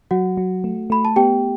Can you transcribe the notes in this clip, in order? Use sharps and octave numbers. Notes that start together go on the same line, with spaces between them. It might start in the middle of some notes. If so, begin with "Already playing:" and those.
F#3 F#4 F#5
F#3
A3
A3 B5
A5
B3 G4 G5